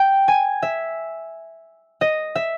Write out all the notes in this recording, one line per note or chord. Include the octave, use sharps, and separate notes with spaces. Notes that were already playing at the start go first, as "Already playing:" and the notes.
Already playing: G5
G#5
E5
D#5
E5